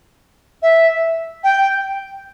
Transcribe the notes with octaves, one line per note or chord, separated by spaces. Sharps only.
E5
G5